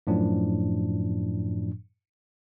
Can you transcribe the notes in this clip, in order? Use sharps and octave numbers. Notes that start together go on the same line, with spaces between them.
F#2 A2 F3 D4